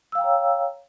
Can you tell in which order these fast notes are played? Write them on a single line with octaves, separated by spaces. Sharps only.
E6 F5 G5 A#5 C#5